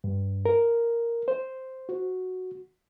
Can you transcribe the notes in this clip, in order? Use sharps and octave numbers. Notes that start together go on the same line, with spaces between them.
G2
A#4
C5
F#4